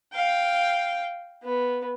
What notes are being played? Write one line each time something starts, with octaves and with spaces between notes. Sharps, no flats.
F5 G5
B3